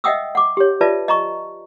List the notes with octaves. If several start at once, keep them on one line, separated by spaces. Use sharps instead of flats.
D#5 E5 F#5 G5 D#6 E6
F#5 D6
G4 C#5
F4 B4 D5 E5 A5
D#5 A#5 C#6